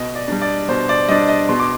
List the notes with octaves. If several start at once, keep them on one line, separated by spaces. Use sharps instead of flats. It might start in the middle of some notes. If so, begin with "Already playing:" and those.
Already playing: B2 D#5
D5
G3 D4
D5
B2 C5
D5
G3 D4 D#5
D#5
B2 C6
D6